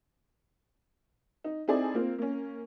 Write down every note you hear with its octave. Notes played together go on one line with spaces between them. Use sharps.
D#4
C4 D#4 E4 G#4 A4 D5
A#3 C4 F4
A#3 C#4